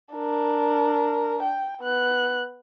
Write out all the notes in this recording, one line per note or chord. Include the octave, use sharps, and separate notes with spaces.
D4 A#4
G5
B3 F#6